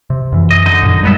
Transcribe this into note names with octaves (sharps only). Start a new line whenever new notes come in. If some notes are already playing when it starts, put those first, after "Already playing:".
C3
F#2 E3
D#5
D3 D#4 D#5
F#2 A#2 D#3
D#2 G3 G#3 B3 E5